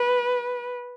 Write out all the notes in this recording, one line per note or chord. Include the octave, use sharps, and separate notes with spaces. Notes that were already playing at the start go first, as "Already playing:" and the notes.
Already playing: B4